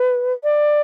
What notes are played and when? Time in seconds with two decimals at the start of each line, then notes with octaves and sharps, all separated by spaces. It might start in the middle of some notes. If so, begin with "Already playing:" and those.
Already playing: B4
0.44 D5